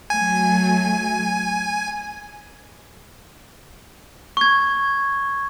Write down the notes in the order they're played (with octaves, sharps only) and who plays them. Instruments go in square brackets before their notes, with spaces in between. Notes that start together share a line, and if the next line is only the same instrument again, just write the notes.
[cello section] F#3 A3 [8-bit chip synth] G#5
[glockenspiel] C#6 G#6